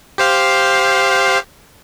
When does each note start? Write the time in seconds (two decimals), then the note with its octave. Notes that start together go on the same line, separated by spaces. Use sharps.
0.18 G4 C5 F5